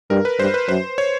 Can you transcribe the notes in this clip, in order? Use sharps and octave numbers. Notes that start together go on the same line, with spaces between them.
G2 A#4
B4
G2 C5
B4
F#2 C5
C#5